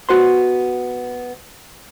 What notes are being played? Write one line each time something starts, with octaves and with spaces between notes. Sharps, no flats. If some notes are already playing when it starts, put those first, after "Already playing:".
B3 F#4 C5 C6